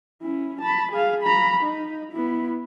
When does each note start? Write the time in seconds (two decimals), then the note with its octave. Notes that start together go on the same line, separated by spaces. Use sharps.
0.22 C#4 E4
0.61 A5 B5
0.92 G#4 F5
1.23 A#5 B5
1.63 D#4
2.12 B3 E4